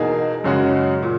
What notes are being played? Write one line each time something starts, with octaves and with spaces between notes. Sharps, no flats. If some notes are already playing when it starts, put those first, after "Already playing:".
Already playing: E2 B2 A#3 D#4 G#4
F#2 C#3 G#3 C#4 F#4
A#2